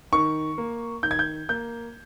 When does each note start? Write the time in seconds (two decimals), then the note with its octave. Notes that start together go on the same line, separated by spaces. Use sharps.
0.13 D#3 C#6
0.58 A#3
1.03 D#3 G6
1.11 G#6
1.19 G6
1.49 A#3 G6